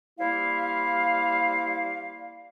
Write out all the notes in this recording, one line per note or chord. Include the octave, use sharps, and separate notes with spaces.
G3 A#3 E4 C5 F5